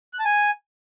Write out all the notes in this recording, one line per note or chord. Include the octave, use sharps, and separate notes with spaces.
F#6
A5
G#5